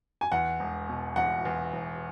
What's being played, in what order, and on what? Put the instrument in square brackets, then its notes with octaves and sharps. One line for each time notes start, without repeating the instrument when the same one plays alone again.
[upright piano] G#5
[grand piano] E2 [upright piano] F#5
[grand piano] E1
B2
[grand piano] E1 [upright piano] F#5
[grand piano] E2
E1